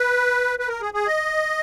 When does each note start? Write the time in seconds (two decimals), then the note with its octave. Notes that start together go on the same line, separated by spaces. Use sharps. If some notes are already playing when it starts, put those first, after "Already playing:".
Already playing: B4
0.59 B4
0.68 A#4
0.81 G#4
0.94 G#4
1.07 D#5